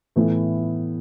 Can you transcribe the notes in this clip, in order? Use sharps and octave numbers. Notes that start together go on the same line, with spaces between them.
A2 E3 B3 E4